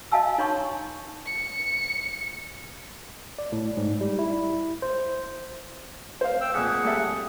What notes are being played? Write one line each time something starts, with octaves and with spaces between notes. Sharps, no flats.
D#5 F5 G#5 A5 E6
D#4 C#5 A#5 C6 C#6
C#7
D5
A2
G#2
G3
E4
C5
C5 F5
G5 E6
F2 A#2 G#4 F#5
G3 A4 E5